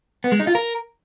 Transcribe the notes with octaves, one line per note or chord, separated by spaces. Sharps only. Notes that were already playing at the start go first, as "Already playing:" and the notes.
B3
G#3
D#4
F4
A#4